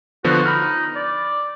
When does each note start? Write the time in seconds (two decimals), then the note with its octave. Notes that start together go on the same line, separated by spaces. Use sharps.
0.24 D3 F3 B3 F#4
0.46 D#4 B5 F6
0.96 D5